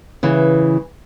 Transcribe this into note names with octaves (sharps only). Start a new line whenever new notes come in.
C#3 E3